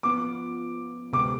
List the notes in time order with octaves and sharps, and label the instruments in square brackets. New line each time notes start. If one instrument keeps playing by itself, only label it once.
[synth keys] F3 B3 F4 [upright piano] D6
[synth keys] D2 C3 G#3 B3 [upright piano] D6